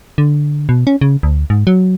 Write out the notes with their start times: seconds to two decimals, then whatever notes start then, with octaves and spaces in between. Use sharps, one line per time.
0.18 D3
0.69 B2
0.87 C#4
1.01 C#3
1.23 D2
1.50 G#2
1.67 F#3